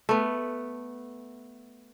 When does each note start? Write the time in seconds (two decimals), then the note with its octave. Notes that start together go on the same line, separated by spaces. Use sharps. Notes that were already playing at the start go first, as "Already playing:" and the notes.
0.09 A3 B3